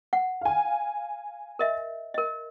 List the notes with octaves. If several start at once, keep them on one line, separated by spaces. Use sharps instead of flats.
F#5
F5 G#5
A#4 D#5 E5
A#4 D#5